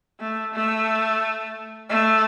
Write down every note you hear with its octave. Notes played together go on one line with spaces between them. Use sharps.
A3
A3
A3